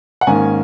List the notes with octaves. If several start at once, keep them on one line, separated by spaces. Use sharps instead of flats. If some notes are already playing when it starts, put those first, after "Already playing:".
F#5
G#2 D#3 A#3 C#4 G#5